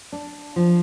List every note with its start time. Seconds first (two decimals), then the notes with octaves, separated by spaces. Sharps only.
0.12 D4
0.56 F3